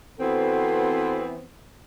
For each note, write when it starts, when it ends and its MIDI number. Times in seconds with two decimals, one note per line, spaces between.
0.20 1.46 52
0.20 1.46 59
0.20 1.46 60
0.20 1.22 66
0.20 1.22 69